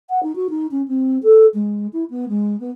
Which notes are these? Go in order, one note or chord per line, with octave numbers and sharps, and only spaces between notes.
F#5
D#4
F#4
D#4
C#4
C4
A4
G#3
E4
B3
G#3
B3